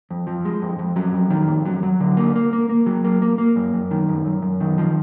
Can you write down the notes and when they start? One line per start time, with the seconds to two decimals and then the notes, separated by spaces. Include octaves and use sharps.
0.11 F2
0.27 F3
0.45 G#3
0.62 F2
0.79 F2
0.96 F#3
1.14 F2
1.30 D#3
1.48 F2
1.65 F#3
1.83 F#3
2.00 D3
2.17 A#3
2.36 A#3
2.53 A#3
2.69 A#3
2.86 F#3
3.04 A#3
3.22 A#3
3.38 A#3
3.56 F#2
3.74 F#2
3.91 D#3
4.09 F#2
4.25 F#2
4.42 F#2
4.60 D#3
4.78 F3